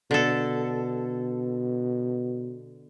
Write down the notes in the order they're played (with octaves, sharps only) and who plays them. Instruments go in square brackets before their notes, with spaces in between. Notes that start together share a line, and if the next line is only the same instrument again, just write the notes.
[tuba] B2 [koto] D3 A4